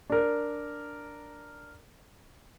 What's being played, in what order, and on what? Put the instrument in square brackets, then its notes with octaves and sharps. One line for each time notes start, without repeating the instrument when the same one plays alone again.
[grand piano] D4 A#4